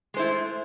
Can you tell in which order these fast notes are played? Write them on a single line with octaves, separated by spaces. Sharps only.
G#3 C5 E4 A3